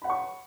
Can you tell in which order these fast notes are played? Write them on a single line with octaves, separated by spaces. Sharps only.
B5 F#5 C#5 C#6